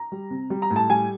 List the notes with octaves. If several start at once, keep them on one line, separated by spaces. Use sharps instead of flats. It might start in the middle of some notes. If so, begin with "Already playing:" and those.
Already playing: A#5
G3
C3
G3
A#5
A2
A5
G3 G#5